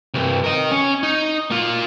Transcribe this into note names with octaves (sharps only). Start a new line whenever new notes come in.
C2 G2
A#4 D#5
C#4
D#4
A#3 F4